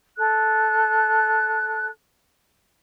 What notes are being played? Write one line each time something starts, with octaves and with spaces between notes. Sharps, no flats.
A4 F#6